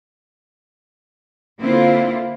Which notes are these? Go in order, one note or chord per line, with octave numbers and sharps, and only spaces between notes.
D3 A#3 C4 E4 F4